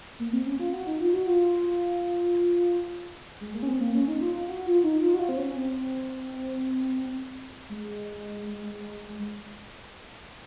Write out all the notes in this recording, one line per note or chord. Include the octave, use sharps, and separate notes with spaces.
A#3
C4
C#4
F4
F#4
D#4
F4
F#4
F4
G#3
A#3
C#4
C4
A#3
C#4
D#4
F4
F4
F#4
F4
D#4
F4
F#4
F4
C4
C#4
C4
G#3